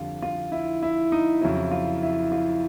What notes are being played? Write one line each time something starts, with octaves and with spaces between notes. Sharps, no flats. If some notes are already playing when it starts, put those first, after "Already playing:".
Already playing: F2 D3 G3 F4
F4
E4
E4
D#4
F2 C#3 F#3 E4
F4
E4
F4